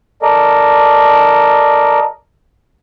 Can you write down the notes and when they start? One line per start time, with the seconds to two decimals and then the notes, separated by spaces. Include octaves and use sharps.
0.22 A4 A#4 D5 D#5